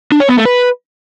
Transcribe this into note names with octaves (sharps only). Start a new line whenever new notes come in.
D4
C#5
B3
A3
B4